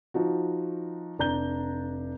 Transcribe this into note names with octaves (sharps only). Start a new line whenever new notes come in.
F3 D#4 F#4
F1 D4 A#5 G6 G7